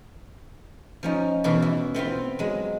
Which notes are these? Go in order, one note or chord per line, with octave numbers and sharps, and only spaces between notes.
F3 C#4 D#4
E2 B2 E3 F#4 F5
E4
B3 C4 E4 F4
F#3 G#3